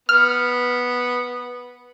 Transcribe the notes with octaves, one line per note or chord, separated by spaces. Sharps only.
B3 F6